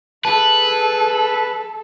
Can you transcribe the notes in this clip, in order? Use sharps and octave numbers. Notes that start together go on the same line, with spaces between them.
G#4 A4 B4 A5